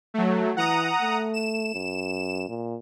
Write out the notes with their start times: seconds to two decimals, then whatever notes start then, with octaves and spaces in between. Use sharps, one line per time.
0.14 F#3 A3
0.57 E3 F#5 A#5 D#6
1.01 A3
1.34 E7
1.74 F#2
2.49 A#2